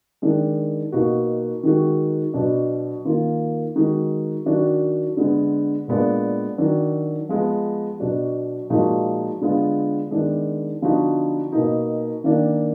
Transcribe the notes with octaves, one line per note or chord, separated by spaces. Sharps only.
D#3 G#3 D4
B2 A#3 D#4 F#4
D#3 G#3 D#4 F#4
B2 F#3 D4
D#3 A#3 F4
D#3 G#3 D#4 F#4
D#3 F#3 D4 F#4
D3 G#3 B3
A#2 G#3 B3 D4
D#3 F#3 D4
F3 G#3 B3
B2 F#3 D4 F#4
A#2 F3 G#3 D#4 F#4
D3 G#3 B3 F4
D#3 G#3 B3 D4
D3 F3 B3 D#4 F#4
B2 A#3 D#4
D#3 A#3 D4